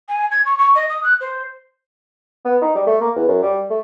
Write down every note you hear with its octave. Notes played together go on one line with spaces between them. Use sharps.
G#5
G#6
C#6
C#6
D#5
D#6
F#6
C5
B3
D#4
G3
A3
A#3
E2
F#2
G3
A3